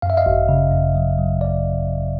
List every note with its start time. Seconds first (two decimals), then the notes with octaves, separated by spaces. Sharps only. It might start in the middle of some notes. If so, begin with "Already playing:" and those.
0.02 F#2 F5
0.10 E5
0.17 D#5 F5
0.26 G#1
0.49 C#3
0.72 F#2
0.95 F#3
1.19 F#3
1.41 D5